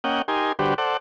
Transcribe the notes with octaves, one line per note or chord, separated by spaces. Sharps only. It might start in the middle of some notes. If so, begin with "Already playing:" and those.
A#3 C#4 D#5 F#5 G5
D#4 G4 A#4 G#5 C6
D3 G3 F#4 G4 B4 C5
A4 C5 D5 F#5